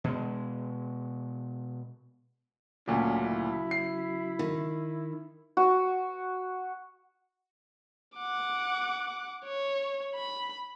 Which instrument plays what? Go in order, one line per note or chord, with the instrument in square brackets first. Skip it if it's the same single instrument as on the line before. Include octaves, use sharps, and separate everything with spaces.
[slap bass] B2 G#3
[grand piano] D2 A#2 [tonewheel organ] C#3 F#3 B5 [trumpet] C#4
[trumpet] E4
[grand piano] C7
[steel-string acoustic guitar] D#3
[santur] F#4
[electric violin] F#5 D6
C#5
B5